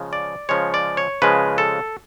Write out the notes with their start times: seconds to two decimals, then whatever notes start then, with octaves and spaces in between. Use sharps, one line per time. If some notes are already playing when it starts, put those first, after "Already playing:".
Already playing: C#3 F3 G#3
0.13 D5
0.49 C#3 F3 G#3 C#5
0.74 D5
0.97 C#5
1.22 C#3 F3 G#3 B4
1.58 A4